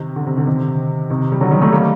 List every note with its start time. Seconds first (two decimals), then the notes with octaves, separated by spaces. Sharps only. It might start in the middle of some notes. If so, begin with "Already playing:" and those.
Already playing: C3 D#3
0.16 D3
0.27 C3
0.37 D3
0.47 C3 D#3
1.10 C3 D#3
1.32 G3
1.41 D3 F#3
1.51 D#3 G3
1.61 F#3 A3
1.72 G3 A#3